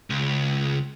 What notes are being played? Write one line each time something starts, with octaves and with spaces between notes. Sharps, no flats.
C#2